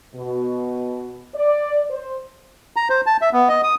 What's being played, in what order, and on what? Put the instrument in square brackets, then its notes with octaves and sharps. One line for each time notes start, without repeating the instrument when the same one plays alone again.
[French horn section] B2
D5
C5
[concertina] A#5
C5
A5
E5
B3
D#5
D#6